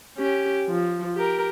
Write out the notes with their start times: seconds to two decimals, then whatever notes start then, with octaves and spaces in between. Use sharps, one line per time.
0.17 C#4 G4
0.68 F3
1.15 G4 A#4